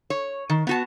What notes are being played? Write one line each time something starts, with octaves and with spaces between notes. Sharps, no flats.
C#5
D#3
B3 F#4 A5